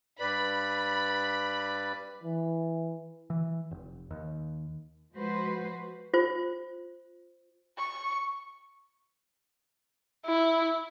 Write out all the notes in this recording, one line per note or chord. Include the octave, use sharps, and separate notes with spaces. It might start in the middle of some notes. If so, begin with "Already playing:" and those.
G2 B4 D5 B5
E3
E3
F1
D#2
F3 G#3 F#4 B4 C5
F4 C5
C#6
E4